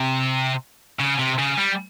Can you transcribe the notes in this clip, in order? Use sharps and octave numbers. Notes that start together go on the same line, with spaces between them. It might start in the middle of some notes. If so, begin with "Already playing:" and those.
Already playing: C3
C#3
C3
C#3
G3